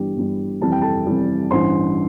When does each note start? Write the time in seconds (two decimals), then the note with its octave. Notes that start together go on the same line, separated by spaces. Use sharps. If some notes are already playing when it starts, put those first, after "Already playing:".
Already playing: G1 G2 E3 G3 G4
0.17 G1 G2 E3 G3
0.61 F1 F2 E3 G3 A5
0.72 G5
0.82 A4 A5
1.06 F1 F2 E3 G3
1.51 A1 G2 E3 G3 C5 C6